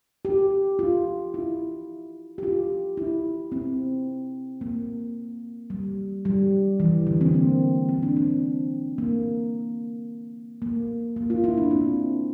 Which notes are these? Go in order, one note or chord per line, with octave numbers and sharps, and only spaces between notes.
G4
F4
E4
G4
F4
E4
C4
A#3
G3
G3
E3
D3
C4
A#3
C4
D4
C4
A#3
A#3
A#3
F4
E4
D4
C4